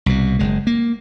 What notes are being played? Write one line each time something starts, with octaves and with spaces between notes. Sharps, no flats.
C2 B2
F#1 G#3
A#3